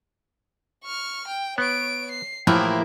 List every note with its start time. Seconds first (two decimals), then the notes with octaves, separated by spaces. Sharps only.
0.84 C#6 F6
1.27 G5
1.58 B3 C#5 D7
2.11 C7
2.47 A2 E3 F3 A#3 E4 G4 A#4 C5